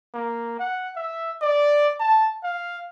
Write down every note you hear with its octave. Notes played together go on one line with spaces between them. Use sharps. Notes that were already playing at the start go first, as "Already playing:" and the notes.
A#3
F#5
E5
D5
A5
F5